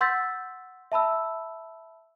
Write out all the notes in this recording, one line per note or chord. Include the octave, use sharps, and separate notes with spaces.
F#5 C6 E6 G6 A6 B6
E5 A5 B5 E6